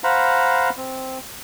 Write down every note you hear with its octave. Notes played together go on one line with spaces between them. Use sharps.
C5 F5 F#5 A#5 B5
C4